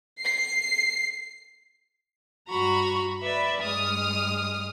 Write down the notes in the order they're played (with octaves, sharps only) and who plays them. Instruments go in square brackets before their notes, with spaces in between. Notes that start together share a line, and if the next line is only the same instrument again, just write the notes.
[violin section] C7
[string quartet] G2 F#4 A#5 B5 C#6
B4 D5 E5 B5
G2 G#3 D#6 F6